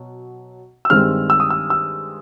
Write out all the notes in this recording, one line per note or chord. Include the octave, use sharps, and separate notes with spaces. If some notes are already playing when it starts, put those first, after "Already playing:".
Already playing: B2 F#3
E6
G2 D#3 G#3 C4 F6
E6
D#6
E6
E6